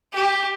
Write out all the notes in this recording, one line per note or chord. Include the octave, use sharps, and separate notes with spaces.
G4